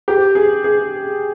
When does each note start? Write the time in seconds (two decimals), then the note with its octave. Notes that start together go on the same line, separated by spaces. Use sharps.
0.08 G4
0.35 G#4
0.64 G#4